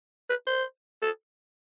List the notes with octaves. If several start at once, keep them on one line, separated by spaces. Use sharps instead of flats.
B4
C5
A4